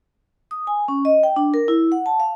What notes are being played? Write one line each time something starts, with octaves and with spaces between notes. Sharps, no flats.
D#6
G#5
C#4
D#5
G5
D4
A#4
E4
F#5
A5
F5